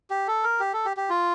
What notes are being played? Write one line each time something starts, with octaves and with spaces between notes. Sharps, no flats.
G4
A4
A#4
G4
A4
G4
G4
F4